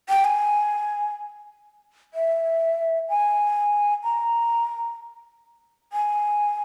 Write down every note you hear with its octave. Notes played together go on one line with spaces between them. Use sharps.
G5
G#5
E5
G#5
A#5
G#5